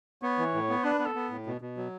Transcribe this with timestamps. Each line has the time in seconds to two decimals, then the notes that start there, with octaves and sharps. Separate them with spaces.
0.23 B3 C#5
0.38 E3
0.54 A2
0.69 B3
0.84 D4 B4
0.99 B3 B4
1.06 A4
1.15 B3
1.30 A2
1.46 B2
1.61 B2
1.77 F#3